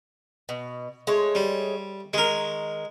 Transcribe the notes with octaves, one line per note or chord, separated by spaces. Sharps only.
B2
G#3 A3 C#5
G3
D#3 G#3 A#4